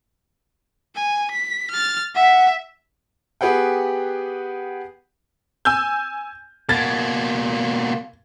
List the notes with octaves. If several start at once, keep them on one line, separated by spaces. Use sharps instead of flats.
G#5
B6
F6 A6
E5 F#5 B6
B3 G4 G#4 B4 F#5 G5
G#5 E6 G6
B2 A#3 G#6 A6